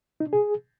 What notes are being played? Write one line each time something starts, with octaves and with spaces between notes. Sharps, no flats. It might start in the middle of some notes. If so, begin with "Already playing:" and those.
D#4
D4
G#4